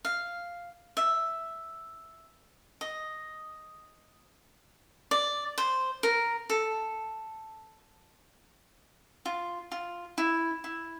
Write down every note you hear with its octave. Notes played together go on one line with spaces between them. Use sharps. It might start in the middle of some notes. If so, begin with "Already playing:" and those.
F5
E5
D#5
D5
C5
A#4
A4
F4
F4
E4
E4